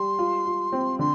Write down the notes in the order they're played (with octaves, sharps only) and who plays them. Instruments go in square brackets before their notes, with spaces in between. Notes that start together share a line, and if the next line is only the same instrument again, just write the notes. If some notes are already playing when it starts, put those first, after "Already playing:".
Already playing: [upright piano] G3 [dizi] C6
[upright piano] F4
F4
C4
[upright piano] D3 [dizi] C6